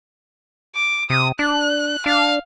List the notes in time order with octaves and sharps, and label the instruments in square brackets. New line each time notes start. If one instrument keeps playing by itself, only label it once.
[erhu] D6
[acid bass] C3 [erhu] D#6
[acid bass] D4 [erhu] F#6
[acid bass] D4 [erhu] F5